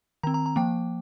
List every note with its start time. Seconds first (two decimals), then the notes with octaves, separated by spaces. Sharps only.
0.23 D#3 C4 A#5
0.34 A#5
0.46 A#5
0.56 F3 A#3 G5